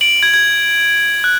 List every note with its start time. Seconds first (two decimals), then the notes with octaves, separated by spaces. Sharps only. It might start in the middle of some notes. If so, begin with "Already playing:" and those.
0.01 D7 F#7
0.23 G#6
0.34 G#6
1.24 F#6